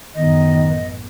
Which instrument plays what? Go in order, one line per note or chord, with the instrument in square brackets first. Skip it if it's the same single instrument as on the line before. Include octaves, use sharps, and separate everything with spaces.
[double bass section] A1 F#2 B3 [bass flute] D#3 [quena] D#5